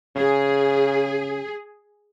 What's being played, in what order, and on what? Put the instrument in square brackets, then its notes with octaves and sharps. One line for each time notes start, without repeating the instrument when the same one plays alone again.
[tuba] C#3 [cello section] G#4